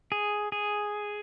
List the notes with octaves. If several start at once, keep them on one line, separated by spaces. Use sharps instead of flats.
G#4
G#4